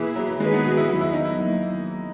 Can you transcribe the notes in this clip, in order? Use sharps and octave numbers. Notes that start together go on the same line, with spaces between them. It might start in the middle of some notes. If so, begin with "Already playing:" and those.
Already playing: B2 E3 A#3 E4 G#4 B4
F#3
D#3 G#3 A#3 D#4 G#4 B4
B3
F#4
E4
E2 D#3 F#3 B3 E4
E4
D#4
E4
D#3 F#3 A#3